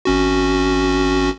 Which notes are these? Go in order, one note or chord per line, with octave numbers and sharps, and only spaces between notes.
G#1 C#4 F#4